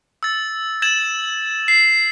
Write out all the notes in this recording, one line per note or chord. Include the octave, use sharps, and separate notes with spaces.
E6 A6
G#6 A6 E7 F#7
C7